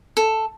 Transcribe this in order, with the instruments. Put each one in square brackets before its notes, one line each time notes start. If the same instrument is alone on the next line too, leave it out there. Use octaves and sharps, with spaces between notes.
[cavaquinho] A4